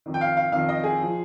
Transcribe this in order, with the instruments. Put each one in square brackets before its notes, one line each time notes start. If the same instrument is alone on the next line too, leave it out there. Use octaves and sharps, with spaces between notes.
[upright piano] F2 D#3
G5
F5
F5
F2 D#3 F5
D#5
G#4
F3